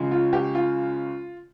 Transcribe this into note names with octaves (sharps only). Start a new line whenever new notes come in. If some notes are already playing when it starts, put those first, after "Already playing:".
Already playing: C#2 C#3 F3 G#3
F4
G4
F4